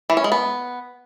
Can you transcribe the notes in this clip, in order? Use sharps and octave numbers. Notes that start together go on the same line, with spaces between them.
E3
C#4
G#3
B3